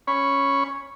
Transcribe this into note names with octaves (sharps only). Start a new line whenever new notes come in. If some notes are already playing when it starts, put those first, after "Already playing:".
C#4 C#5 B5